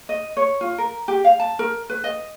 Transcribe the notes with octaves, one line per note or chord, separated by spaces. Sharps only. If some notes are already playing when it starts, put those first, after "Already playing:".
D#5
C#5
F4
A#4
G4
F5
A5
A#4
B4
D#5